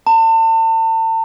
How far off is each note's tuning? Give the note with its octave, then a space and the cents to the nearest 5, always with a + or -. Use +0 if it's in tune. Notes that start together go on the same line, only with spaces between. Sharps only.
A5 +40